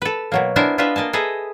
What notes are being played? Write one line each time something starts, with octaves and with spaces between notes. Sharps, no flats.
A4 B4
B2 F#3 A#3
B3 D4 E4 A#4 C5 G#5
D4 F4 G4 B4 D#5 E5
A#3 D#5 G#5 A5
G#4 A4 B4 D#5 E5 A#5